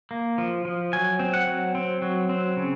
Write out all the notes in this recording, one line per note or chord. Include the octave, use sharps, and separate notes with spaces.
A#3
F3
F3
F#3 G#5
C4
F#5
F#3
C4
F#3
C4
C#3